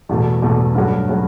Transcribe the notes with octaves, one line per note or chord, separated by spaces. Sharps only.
E2 B2 A3
E2 B2 A3
G2 F#3 A3 C#4 F#4
F#3 A3 C#4 F#4